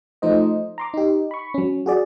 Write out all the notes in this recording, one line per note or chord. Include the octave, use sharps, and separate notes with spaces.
F3 A3 D#4 C5 D#5
A#5 C6 D6
D#4 G4
B5 C#6
F#3 C#4
F#4 G#4 D5